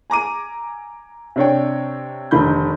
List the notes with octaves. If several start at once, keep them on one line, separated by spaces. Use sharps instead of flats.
G#5 A#5 D6 D#7
C3 D4 C#5 G5
F1 D3 D#3 B5 G6